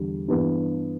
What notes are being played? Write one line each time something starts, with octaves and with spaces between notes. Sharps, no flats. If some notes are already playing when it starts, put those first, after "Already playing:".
Already playing: E2 D3 G3
G2 E3 B3 D4